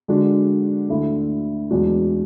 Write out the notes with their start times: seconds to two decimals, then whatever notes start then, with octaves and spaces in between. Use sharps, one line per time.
0.08 D3 G#3 D4 F#4
0.89 D2 D3 A3 E4
1.71 E2 B2 G#3 D4 F#4